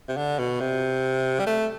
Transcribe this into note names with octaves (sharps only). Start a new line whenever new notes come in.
C3
D3
B2
C3
G3
A3